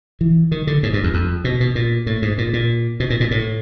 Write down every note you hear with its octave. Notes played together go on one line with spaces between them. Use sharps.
E3
D#3
D3
G#2
G2
E2
F2
B2
B2
A#2
A2
G#2
A#2
A#2
B2
A#2
A#2
A2